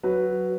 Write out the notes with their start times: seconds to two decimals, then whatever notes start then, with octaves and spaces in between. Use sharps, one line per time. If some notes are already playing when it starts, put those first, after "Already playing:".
0.03 F#3 B4